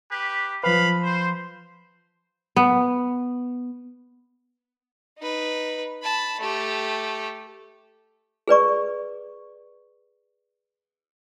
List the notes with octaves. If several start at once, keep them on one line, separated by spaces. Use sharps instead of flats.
G4 B4
F3 B4 F5 B5
C5
B3
D#4 B4
A5 B5
A3 G4
G#4 B4 D5 C#6